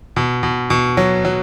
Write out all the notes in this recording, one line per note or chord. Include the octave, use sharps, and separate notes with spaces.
B2
B2
B2
F#3
F#3